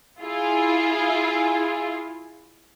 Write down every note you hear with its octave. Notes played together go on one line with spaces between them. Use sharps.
E4 F4 G#4